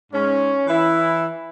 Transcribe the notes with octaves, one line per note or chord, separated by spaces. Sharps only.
G#2 G#3 C#4
E3 E4